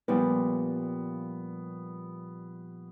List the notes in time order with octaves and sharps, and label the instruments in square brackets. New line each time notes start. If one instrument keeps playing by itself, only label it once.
[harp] A#2 F3 G3 [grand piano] B3